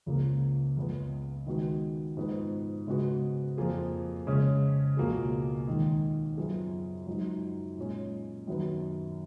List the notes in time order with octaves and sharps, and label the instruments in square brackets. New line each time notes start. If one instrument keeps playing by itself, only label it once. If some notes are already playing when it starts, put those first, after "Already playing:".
[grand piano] C#2 C#3 F3 A#3
C#2 C#3 G#3 B3
D#3 G#3 B3 F#4
G#2 F3 B3
C#3 G#3 B3 F#4
F2 F3 A#3 F4 G#4
C#3 G#3 C#4
C#2 B2 A#3 F4 G#4
D#2 D#3 G#3
F#2 F3 B3 F4 G#4
F#2 F3 G#3 D#4 F#4
A#2 G#3 C#4
F#2 D#3 F#3 B3